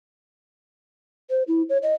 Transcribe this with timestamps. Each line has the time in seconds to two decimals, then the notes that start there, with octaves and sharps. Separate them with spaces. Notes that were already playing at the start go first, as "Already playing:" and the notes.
1.30 C5
1.48 E4
1.69 C#5
1.83 D#5